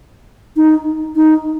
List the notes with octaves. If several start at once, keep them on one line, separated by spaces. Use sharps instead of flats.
D#4
D#4